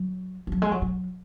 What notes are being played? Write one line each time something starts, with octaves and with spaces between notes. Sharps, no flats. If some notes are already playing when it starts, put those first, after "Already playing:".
Already playing: F#3
F3
F#3
G#3
F#3
F#3